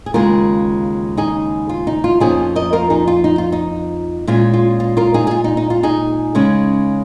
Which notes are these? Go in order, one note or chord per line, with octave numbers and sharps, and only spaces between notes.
G#4
D#2 C#3 G#3 F4 A#4
D#4 G#4
F4
D#4
F4
F2 F3 A#3 C#4 D#4 G#4
A#4 D#5
F4 A#4
D#4 G#4
F4
D#4
F4
D#4
A#2 G#3 C#4 F4
F4
F4
F4 A#4
D#4 G#4
G#4
F4
D#4
D#4
F4
D#4 G#4
C#3 G#3 C#4